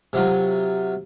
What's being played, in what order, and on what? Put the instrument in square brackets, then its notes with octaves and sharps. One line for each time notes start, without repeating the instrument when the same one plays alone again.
[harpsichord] C3 F#3 F4